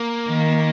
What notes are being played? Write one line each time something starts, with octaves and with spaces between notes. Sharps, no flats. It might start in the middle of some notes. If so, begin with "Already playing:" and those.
Already playing: A#3
D#3